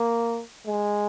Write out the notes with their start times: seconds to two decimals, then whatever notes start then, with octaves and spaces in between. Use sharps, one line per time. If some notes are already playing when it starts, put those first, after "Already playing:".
Already playing: A#3
0.66 G#3